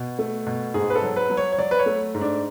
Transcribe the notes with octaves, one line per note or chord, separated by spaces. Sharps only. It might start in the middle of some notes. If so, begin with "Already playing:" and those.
Already playing: B2
A3
B2
G#2 G#4
B4
A4
F#3
B4
F#3
C#5
C#5
F#3 D5
B4
C#5
A3
G#2
D4